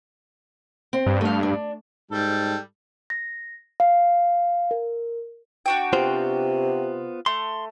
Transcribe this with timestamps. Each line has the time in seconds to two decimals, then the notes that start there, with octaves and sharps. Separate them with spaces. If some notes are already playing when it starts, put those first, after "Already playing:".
0.93 C4
1.06 G2
1.21 A3 F5
1.43 D4
2.11 G#2 G3 A4
3.10 A#6
3.80 F5
4.71 A#4
5.66 D4 F#4 G5
5.93 C3 B3 F4 C5
7.26 A3 C6